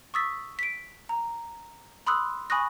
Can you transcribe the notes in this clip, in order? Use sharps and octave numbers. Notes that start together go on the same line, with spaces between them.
C#6 D#6 E6 A6 B6
B6 D7
A#5
B5 C6 D#6 E6 F#6
G#5 B5 C#6 D#6 F#6 A#6